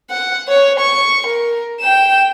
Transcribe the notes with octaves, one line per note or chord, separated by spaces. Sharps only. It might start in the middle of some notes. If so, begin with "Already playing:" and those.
F#5
C#5
C#6
A#4
G5 E7